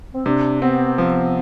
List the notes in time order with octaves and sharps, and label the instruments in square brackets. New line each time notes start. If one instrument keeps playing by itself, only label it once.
[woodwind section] C4
[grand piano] C3 [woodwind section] D4
[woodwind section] B3 [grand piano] C4
[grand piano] F3 [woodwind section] B3